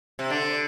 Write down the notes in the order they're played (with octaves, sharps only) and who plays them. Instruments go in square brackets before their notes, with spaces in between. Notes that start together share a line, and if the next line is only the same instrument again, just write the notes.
[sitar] C3
[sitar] D3 [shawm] D4